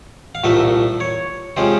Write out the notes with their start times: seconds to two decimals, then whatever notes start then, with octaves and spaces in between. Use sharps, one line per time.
0.35 F5
0.44 C2 A#2 F3 A3 E5
1.00 C#5
1.57 C3 F3 G#3 C#4 C5